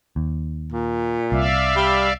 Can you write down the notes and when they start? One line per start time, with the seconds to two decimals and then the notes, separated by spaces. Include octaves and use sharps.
0.16 D#2
0.72 A#2
1.32 C2 D5 E5 F5
1.76 G3